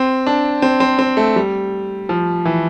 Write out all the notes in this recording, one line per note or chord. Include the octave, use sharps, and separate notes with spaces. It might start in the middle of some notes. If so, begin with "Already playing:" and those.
Already playing: C4
D4
C4
C4
C4
A3
G3
F3
E3